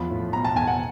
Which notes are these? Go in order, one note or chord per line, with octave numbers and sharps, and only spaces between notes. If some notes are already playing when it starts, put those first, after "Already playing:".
Already playing: E2 F3 B5
A2
B2 A#5
A5
E2 G#5
F#5